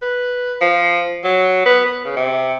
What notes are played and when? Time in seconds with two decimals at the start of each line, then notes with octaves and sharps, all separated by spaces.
0.02 B4
0.61 F3
1.24 F#3
1.66 B3
1.85 B3
2.05 C#3
2.16 C3